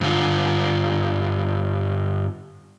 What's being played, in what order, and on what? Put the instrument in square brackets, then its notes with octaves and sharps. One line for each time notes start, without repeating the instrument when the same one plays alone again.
[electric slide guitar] G2 D3 F4